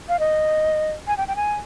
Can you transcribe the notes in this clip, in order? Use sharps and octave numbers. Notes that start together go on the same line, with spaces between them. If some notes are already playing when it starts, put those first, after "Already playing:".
F5
D#5
G#5
G5
G5
G#5